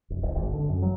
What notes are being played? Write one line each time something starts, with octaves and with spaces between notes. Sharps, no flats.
F1
D1
G#1
D3
F#2
F#3